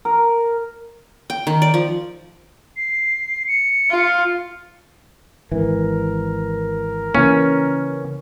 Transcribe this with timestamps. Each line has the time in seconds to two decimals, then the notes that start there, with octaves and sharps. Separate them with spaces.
0.05 A#4
1.30 G5
1.47 D#3
1.62 D5
1.74 F3
2.77 C7
3.47 C#7
3.90 F4
5.52 G#1 E3 A#4
7.15 C#3 E3 A#3 C#4